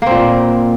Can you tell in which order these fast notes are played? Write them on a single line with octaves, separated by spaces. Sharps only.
A#3 C4 A#2